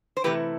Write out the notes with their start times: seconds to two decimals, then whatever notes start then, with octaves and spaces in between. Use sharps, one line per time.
0.17 C5
0.24 C3 E3 A3 E4 G4 B4